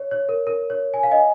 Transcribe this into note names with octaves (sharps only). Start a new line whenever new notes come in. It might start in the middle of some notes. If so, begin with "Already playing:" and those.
Already playing: C#5
C#5
A#4
A#4
C#5
G#5
F5
D#5 G#5